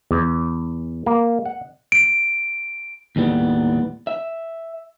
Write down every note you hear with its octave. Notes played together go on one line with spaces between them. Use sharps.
E2
A#3
F#5
D7
D#2 A2 G3 B3
E5